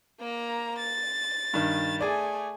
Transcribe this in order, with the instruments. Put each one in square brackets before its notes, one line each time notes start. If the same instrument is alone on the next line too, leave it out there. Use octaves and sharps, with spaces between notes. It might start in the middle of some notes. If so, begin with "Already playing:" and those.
[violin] A#3 A#5
A6
[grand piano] G2 D#3
[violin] A3 G#5 [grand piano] G#4 D5